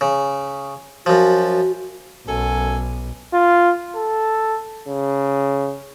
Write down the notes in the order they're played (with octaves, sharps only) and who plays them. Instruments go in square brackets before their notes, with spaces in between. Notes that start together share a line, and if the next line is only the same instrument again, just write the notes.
[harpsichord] C#3
[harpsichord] F#2 F3 [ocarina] F#4
[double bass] B1 [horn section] F#2 A4 G#5
[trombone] F4
A4
C#3